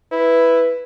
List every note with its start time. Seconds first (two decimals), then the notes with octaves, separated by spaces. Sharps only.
0.12 E4 B4